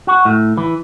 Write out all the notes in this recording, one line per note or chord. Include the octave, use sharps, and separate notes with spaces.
F#4
A2
E3